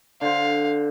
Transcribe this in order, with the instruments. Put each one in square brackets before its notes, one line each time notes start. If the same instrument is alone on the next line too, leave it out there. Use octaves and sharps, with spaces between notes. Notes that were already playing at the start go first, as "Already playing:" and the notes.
[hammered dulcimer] D3 C5 [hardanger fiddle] F5